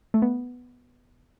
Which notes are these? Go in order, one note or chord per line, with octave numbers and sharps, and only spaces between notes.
A3
B3